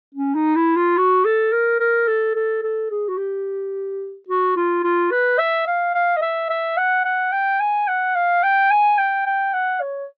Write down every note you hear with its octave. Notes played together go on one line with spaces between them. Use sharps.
C#4
D#4
E4
F4
F#4
A4
A#4
A#4
A4
A4
A4
G#4
F#4
G4
F#4
F4
F4
B4
E5
F5
F5
D#5
E5
E5
F#5
F#5
G5
G#5
F#5
F5
G5
G#5
G5
G5
F#5
C#5